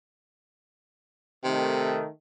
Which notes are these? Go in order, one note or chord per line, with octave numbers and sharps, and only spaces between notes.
C3 D#3 A3